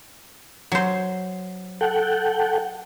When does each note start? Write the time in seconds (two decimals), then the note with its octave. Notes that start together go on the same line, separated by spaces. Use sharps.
0.72 F#3 C5
1.81 A4 F#5 G5